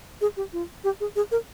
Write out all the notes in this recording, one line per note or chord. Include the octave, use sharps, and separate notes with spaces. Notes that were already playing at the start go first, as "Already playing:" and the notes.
G#4
G4
F4
G4
G#4
G#4
A#4